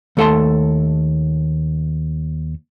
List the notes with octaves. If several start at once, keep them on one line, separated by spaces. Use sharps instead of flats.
D#2 A3 A4 E5 A5 C6